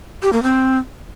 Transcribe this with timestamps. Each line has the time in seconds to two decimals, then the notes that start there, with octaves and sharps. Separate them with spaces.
0.23 G4
0.33 A#3
0.43 C4